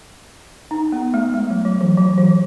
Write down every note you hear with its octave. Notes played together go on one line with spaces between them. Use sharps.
D#4
B3
A3
G#3
F#3
F#3
E3
F#3
E3